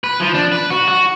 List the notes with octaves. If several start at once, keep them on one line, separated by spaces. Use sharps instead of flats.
B4
F3
D4
B4
F#4
F#4